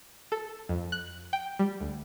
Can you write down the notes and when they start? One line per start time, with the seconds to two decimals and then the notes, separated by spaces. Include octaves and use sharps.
0.32 A4
0.69 F2
0.92 F#6
1.33 G5
1.59 G3
1.81 D2